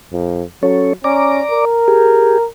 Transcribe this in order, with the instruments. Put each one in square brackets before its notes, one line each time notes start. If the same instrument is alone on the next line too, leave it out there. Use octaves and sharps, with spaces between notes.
[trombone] F2
[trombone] F#3 [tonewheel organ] C#4 A4 C#5
[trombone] C#4 [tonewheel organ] D5 A#5 D6
[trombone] A#4
[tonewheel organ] G4 G#4